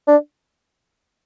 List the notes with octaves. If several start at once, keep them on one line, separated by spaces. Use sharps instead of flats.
D4